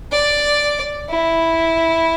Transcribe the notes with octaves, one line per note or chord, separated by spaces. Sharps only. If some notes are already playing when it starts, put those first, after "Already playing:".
D5
E4